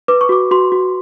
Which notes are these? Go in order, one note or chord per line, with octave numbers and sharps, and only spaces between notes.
B4 D6
C#6
F#4 D6
F#4 C6
F#4